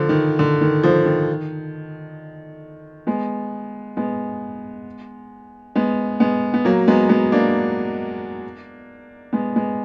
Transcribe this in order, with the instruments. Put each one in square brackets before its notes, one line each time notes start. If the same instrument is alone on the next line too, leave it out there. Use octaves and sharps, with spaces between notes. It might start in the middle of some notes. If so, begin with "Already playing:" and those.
Already playing: [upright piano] D3 F3
D#3
D3
D#3
D3 F3
D#3
G#3 B3
G#3 B3
G#3 B3
G#3 B3
B3
F#3 A#3
G#3 B3
G#3 B3
A#3 D4
G#3 B3
G#3 B3